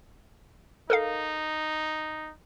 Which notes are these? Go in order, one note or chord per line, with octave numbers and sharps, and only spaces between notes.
D#4 A4 A#4 F5